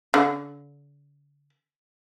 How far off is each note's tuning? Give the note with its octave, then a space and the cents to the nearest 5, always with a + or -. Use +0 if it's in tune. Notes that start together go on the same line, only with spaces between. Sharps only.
D3 -40